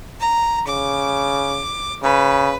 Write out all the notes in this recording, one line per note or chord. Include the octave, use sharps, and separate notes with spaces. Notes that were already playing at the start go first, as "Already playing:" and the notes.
A#5
C#3 D6
C#3 B4